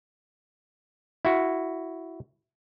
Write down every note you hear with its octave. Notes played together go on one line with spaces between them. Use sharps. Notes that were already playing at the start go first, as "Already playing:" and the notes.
E4 F#4